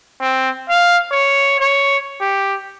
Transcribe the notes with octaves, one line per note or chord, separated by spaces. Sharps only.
C4
F5
C#5
C#5
G4